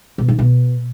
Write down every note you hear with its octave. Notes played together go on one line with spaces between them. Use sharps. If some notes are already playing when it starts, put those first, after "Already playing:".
B2
D#3
B2